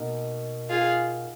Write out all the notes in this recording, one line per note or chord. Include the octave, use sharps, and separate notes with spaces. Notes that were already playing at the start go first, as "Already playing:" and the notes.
Already playing: B2 A#3 D#4
F4 G#4